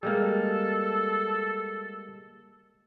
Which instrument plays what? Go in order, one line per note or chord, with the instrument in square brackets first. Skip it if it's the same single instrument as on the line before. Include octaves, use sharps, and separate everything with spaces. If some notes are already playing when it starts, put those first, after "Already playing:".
[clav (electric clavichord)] G3 G#3 A#3 [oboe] A4